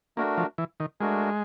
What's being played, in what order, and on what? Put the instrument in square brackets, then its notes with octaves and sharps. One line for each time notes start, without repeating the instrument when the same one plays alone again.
[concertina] A3 D4 F#4 A#4 [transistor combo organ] A#3
[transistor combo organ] F3
E3
D#3
[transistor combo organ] G#3 [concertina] A3 D4 F#4 A#4